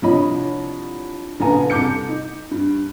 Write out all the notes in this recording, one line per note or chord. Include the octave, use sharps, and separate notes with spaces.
C2 F3 D4 C#5 D#5 B5
A#1 C#3 B3 A4 G#5 A#5
C2 A4 D6 G6 C#7
D#4
G2